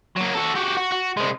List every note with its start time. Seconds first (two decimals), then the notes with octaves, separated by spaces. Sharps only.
0.17 F#3 A#3
0.35 F#4 A4
0.55 F#4 G4
0.77 F#4
0.92 F#4
1.17 C2 G#3